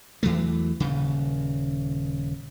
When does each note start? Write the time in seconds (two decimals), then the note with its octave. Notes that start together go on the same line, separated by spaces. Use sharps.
0.23 E2 E3 F#3 A3
0.80 D#1 C#3